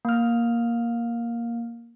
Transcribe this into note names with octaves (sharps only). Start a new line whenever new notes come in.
A#3 F6